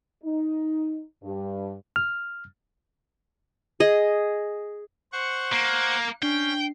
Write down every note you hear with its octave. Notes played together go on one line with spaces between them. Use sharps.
D#4
G2
F6
G#4 D#5
C5 F#5 C#6
A#3 F#6 C7 D7
C#4 D4 G5 C7